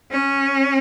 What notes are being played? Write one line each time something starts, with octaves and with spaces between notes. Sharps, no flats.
C#4